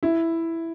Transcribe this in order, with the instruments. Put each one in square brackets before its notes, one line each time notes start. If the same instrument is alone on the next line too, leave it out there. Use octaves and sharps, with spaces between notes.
[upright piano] E4